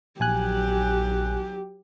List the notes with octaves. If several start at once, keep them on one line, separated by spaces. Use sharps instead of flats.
A#1 F#3 G4 G#5 F#6